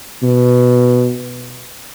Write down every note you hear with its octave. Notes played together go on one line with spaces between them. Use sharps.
B2